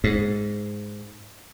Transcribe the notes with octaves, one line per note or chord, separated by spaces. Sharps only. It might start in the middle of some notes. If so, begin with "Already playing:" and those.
G#2